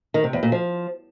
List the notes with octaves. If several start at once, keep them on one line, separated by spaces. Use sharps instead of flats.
D#3
C3
E2
A#2
F3